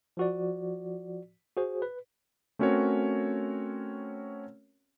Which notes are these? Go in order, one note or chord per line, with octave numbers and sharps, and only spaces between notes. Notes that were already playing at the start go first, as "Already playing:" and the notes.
F3 F#4 D5
F#4 G#4 C5
B4
A3 C4 C#4 F#4 A#4 C#5